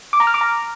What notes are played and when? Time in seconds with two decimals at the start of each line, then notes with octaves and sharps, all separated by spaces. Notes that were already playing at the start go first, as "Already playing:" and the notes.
0.13 D6
0.20 A#5
0.27 F6
0.34 D6
0.41 A#5